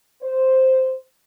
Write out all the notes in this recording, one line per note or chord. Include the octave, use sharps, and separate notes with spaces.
C5